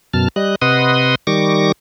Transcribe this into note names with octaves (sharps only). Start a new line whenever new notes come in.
F#2 B2 A5 F6
G3 D#5 F#6
C3 B4 D#5 F#5 C6 D#6
D#3 G3 C#6 D6 A#6